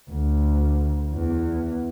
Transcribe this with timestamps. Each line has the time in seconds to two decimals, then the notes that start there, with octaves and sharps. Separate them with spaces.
0.10 D2
1.14 E2